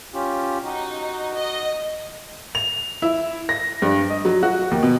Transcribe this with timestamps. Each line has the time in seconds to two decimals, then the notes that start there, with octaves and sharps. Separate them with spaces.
0.14 C#4 F4 G4
0.65 D#4 F#4
1.38 D#5
2.55 F7
3.02 E4
3.49 A#6
3.82 G2
4.10 D#5
4.25 F#3
4.43 F#4
4.71 D#2
4.83 B2